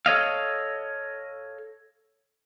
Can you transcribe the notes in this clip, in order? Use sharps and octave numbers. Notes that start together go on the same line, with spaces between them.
A4 C#5 D#5 F5